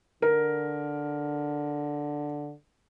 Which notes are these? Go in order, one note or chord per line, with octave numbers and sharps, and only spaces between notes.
D3 A#4